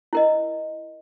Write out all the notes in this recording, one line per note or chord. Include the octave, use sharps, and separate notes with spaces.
E4 A#4 D#5